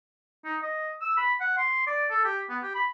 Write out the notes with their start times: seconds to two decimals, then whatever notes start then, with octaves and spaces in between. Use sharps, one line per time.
0.45 D#4
0.62 D#5
1.01 E6
1.17 B5
1.40 F#5
1.57 C6
1.87 D5
2.10 A4
2.25 G4
2.50 B3
2.63 G4
2.75 B5